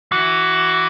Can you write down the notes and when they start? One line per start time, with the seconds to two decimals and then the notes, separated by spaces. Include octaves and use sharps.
0.12 E3 F#4